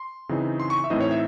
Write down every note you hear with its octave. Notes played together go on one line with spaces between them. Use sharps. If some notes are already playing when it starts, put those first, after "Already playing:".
Already playing: C6
C#3 E3 C4 D#4
C6
C#6
E5
A2 E3 C4 D#4 D#5
C#5
E5